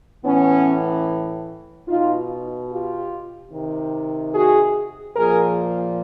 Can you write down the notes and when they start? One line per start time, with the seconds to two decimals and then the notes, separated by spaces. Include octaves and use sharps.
0.24 A2 E3 B3 C#4
1.87 B2 D#4 F4
2.70 F4 G4
3.51 C3 D#3
4.33 F#4 G#4
5.15 A#2 F3 G#4 A#4